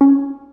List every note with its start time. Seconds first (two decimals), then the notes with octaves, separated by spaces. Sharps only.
0.01 C#4